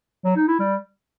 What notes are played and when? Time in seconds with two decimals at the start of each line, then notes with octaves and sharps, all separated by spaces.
0.25 F#3
0.36 D#4
0.48 E4
0.60 G3